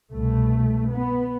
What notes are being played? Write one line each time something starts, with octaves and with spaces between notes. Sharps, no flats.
C2 B2 A3
B3